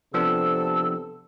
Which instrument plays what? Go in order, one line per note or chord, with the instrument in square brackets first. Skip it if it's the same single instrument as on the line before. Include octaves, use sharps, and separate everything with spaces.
[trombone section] C3 A4 [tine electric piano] F3 B3 D4 [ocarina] E6